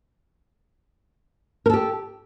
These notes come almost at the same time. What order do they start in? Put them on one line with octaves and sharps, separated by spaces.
A#4 A4 G4